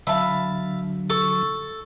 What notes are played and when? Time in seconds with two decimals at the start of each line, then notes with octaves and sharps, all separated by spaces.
0.07 D3 F#3 E5 F5 A5 B5
1.10 A4 C#6